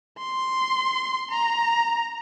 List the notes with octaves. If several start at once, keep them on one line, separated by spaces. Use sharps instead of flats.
C6
A#5